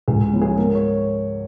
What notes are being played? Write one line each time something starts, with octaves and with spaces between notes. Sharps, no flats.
C#2 G#4
C#3 F3
G#4
G#2 A#4
C#5